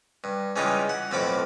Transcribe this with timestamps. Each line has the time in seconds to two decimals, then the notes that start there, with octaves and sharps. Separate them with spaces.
0.24 G2
0.56 C#3 E3 G3 G#3 D#4 F4
0.89 F#5
1.11 B1 F2 A2 F3 B5 D6